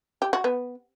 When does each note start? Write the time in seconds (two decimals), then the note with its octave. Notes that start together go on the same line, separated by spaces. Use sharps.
0.22 G4
0.33 F#4
0.44 B3